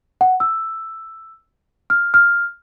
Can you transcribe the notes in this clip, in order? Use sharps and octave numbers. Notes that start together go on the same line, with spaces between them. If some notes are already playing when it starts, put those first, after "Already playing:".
F#5
E6
F6
F6